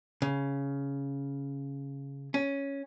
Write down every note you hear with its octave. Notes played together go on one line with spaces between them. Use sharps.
C#3
C#4